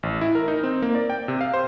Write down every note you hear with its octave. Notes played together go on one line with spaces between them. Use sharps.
A1
E4
A#4
D#4
C4
A#3
D5
G5
C3
F5
C5